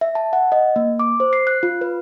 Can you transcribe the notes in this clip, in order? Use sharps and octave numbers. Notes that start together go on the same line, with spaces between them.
E5
A5
F#5
D#5
A#3
D6
C5
C7
F#6
F4
B4